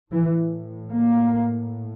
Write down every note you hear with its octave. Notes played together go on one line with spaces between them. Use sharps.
A2 E3
A#3